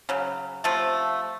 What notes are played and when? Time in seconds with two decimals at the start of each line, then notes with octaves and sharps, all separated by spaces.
0.09 C#3 F#3
0.64 C3 F3 A3